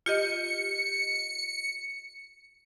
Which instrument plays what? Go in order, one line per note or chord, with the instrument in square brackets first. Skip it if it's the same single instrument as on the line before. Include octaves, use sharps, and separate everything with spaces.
[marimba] F4 G4 D#5 [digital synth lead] C#7